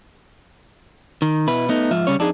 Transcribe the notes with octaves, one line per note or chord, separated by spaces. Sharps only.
D#3
B2 E4 B4
A3 B3 D#4
G#2 F3 F4 E5
C#3 G3 C#4 C#5
F2 D4 D#4 G#4